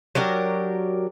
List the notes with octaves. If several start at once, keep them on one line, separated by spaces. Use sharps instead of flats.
F#3 D4 G4 A#4